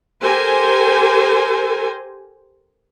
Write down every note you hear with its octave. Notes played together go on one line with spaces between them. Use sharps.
G4 A4 A#4 C5 G#5